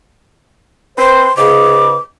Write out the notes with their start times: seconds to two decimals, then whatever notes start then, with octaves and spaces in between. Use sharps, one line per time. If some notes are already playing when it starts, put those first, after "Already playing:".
0.98 C4 B4 C5 C6
1.37 C#2 G#2 C#3 D6